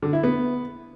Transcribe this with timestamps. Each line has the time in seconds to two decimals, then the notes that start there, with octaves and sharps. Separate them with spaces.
0.02 D3
0.13 E4
0.23 B3